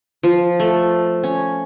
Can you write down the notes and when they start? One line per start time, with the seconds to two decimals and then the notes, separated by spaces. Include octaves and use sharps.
0.23 F3
0.60 A3
1.24 C#4